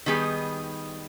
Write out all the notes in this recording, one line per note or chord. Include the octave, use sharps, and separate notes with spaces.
D#3 G3 B3 D#4 G#4